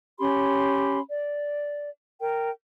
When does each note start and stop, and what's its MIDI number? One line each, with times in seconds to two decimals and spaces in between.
0.19 0.99 61
0.19 0.99 67
0.19 0.99 83
0.19 0.99 84
1.09 1.90 74
2.21 2.50 70
2.21 2.50 79